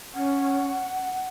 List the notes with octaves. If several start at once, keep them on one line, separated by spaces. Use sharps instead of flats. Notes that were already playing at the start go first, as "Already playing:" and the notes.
C#4 F#5